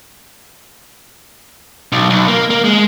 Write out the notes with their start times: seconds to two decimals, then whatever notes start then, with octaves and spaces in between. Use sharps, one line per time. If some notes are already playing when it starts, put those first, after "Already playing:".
1.92 B1
2.10 B1
2.28 A#3
2.50 A#3
2.64 G#3